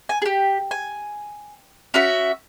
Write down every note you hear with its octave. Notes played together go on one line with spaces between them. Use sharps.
G#5
G4 G#4
G#5
C#4 F#4 E5